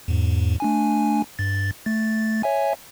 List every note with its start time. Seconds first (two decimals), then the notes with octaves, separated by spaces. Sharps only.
0.08 E2 G#2
0.60 A3 D4 G#5
1.39 G2 A6
1.86 A3 A6
2.43 C#5 E5 G#5